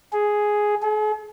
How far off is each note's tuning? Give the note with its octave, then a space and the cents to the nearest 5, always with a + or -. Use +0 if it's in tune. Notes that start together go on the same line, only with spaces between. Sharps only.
G#4 +5
G#4 +45